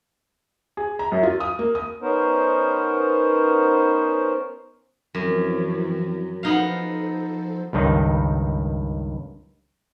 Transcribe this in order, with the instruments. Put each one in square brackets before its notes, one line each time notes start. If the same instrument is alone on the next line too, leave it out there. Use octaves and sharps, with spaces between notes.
[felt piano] G#4
A#5
F#2
F4
D#6
A#3
D#6
[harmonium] B3 C#4 D#4 A#4 C5
[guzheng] F#2 [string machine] E3 F3 C4
[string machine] F3 A4 C5 [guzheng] B3 D#4 F5
[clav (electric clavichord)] C#2 G2 D#3 D#4